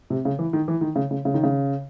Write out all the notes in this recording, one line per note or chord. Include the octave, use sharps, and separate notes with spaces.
C3
C#3
E3
D#3
E3
D#3
C#3
C#3
C#3
D#3
C#3